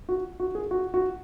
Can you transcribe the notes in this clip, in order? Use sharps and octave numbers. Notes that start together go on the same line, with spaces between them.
F#4
F#4
G#4
F#4
F#4